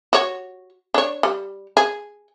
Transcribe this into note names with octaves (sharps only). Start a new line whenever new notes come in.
F#4 C#5
D4 C#5
G3
G#4